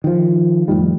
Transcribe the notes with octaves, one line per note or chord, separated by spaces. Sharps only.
D#3 F3
F2 A2 D#3 G3